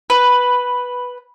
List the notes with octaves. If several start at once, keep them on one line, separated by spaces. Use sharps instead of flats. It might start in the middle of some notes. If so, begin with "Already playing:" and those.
B4